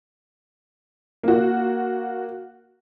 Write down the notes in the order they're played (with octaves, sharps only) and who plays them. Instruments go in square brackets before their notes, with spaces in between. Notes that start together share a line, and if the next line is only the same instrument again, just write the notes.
[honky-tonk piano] A#3 F#4